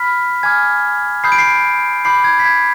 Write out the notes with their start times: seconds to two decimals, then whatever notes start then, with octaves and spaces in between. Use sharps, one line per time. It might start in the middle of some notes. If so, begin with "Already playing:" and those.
Already playing: B5 F6 B6
0.43 G#5 D6 F6 G#6
1.24 B5 D#6 G6 C7
1.32 D7
1.38 C7
2.05 B5 D6 G6 C7
2.24 G#6
2.40 B6
2.46 G#6